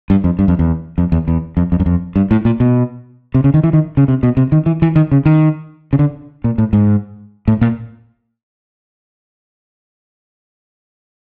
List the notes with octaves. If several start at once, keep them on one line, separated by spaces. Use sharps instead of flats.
G2
F2
G2
F2
E2
F2
E2
E2
F2
F2
F#2
F2
G2
A2
A#2
B2
C3
C#3
D#3
E3
D#3
C#3
C3
B2
C3
D#3
E3
E3
D#3
C#3
D#3
C#3
D3
A#2
A2
G#2
A2
A#2